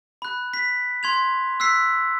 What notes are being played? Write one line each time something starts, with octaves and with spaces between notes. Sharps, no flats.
B5 F#6
B6
C6 G#6 F7
E6 F#6 B6 C7